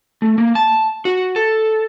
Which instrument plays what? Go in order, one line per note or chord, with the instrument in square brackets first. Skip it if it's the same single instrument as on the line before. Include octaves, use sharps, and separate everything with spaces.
[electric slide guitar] A3
A#3
A5
F#4
A4